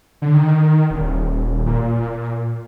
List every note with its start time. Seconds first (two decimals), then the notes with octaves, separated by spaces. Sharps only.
0.22 D3
0.34 D#3
0.90 D#1
1.67 A#2